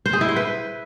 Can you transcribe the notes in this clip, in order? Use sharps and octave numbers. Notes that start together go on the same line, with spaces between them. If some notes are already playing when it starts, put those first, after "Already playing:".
C5
G#4
E4
C5
B4